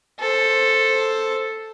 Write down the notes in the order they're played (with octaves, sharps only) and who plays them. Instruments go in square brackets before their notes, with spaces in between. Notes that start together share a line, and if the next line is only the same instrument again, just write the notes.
[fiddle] A4 C5